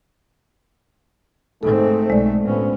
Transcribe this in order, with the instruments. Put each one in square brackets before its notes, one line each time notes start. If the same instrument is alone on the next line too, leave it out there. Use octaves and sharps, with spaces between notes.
[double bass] G#2 C4 [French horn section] A3 D#4 [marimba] A4
[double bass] B1 [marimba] G#3 D5
[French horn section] D2 B3 C5 [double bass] A2 C#4